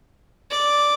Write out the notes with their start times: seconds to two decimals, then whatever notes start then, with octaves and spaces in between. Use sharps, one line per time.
0.51 D5